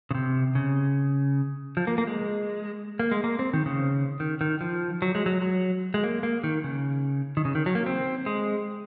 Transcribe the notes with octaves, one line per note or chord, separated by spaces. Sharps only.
C#3
C3
C#3
F3
A#3
A#3
G#3
A#3
G#3
A#3
C4
D#3
C#3
D#3
D#3
F3
F#3
G#3
F#3
F#3
G#3
A#3
A#3
D#3
C#3
D#3
C#3
D#3
F#3
A#3
C4
G#3